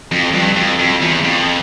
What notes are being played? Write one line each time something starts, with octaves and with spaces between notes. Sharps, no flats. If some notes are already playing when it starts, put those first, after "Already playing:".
F2
G2
F2
F2
E2
F2